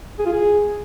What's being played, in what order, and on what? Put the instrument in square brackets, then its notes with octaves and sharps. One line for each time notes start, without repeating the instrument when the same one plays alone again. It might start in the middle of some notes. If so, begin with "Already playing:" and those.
[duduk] G#4
F4
G#4